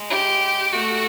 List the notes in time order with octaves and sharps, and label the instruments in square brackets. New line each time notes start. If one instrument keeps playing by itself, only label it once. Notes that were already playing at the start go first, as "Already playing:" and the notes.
Already playing: [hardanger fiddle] G#3
[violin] G4
[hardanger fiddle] A3 [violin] F#4